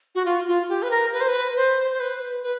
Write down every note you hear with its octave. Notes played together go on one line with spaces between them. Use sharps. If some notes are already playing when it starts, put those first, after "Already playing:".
F#4
F4
F4
G4
B4
A#4
B4
C5
B4
C5
C5
B4
B4